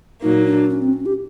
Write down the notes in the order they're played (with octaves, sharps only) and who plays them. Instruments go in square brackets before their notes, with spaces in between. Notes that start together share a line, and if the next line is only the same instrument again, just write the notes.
[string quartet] A#2 F#3 A#3 [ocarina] D#4
[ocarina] D4
C#4
C4
C#4
G4